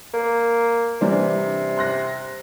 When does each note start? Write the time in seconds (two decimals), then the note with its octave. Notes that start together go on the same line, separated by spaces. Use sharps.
0.14 A#3
1.01 C3 E3 G3 D4
1.78 C6 F#6 A#6